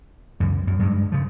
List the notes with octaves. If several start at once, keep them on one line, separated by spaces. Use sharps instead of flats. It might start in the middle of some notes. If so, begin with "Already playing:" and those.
C#2 F#2
F#2
G2 G#3
C#3 F3